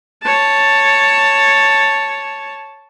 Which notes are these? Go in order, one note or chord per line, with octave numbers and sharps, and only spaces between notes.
C#5 A5